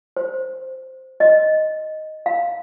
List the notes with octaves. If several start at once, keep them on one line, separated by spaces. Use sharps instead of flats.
C5
D#5
F5